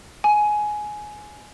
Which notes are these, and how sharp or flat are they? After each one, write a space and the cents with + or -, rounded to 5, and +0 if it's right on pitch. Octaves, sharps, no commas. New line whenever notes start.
G#5 +15